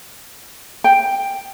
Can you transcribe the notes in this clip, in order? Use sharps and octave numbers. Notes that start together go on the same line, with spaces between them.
G5